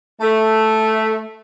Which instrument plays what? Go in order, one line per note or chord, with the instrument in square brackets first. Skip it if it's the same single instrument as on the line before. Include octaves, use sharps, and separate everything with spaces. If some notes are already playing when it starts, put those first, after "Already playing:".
[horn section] A3